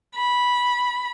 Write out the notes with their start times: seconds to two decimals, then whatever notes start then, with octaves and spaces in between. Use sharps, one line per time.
0.14 B5